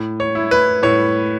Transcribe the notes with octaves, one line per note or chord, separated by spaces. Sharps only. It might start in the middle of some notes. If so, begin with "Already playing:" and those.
Already playing: A2
C#5
E4
B4
A2 C#5